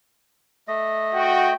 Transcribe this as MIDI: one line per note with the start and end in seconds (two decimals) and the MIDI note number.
0.68 1.54 57
0.68 1.54 75
1.14 1.53 66
1.14 1.53 79